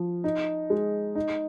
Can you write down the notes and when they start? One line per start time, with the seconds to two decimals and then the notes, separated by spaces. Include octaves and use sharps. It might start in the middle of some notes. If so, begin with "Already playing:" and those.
Already playing: F3
0.24 D#4
0.70 G#3
1.15 D#4